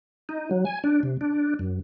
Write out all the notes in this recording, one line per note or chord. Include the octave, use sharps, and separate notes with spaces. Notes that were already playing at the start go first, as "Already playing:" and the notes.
D#4
F#3
G#5
D4
C3
D4
F#2